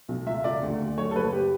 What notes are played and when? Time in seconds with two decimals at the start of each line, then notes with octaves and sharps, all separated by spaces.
0.08 B1
0.26 C#2 E5
0.44 C#2 D5
0.62 D2
0.80 D2
0.97 F#3 C#5
1.11 A4
1.15 F#1 B4
1.32 G4